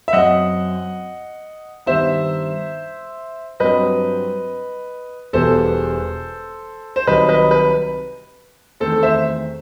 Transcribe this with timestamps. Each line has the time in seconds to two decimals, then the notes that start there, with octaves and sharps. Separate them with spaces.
0.08 E5
0.13 F#2 F#3 C4 D#5 F#5
1.86 G2 D#3 G3 B3 C5 E5
3.60 G2 F#3 C4 B4 D#5
5.33 E1 E2 B2 G3 B3 A4 C5
6.96 C5
7.07 C2 C3 D#3 F#3 B4 D#5
7.29 B4 D#5
7.51 B4
8.80 E2 D#3 A3 C4 A4 C5
9.03 C5 E5